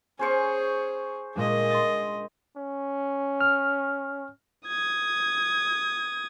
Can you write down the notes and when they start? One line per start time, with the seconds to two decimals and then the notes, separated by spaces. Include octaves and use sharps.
0.19 C#4 G#4 C5 C#6
1.36 A#2 G#3 D4 G#4 D#5
1.70 C6 A6
2.56 C#4
3.41 F6
4.68 D#6 G#6